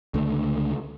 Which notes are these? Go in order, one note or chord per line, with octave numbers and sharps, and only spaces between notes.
C#2 D3 A3